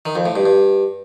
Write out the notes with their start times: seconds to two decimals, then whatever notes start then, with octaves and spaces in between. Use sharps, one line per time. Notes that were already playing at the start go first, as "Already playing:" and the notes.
0.06 D#3
0.16 F2
0.26 A2
0.36 G2
0.46 G2